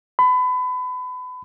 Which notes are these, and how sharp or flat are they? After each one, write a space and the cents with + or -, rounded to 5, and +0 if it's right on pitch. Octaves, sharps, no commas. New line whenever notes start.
B5 +30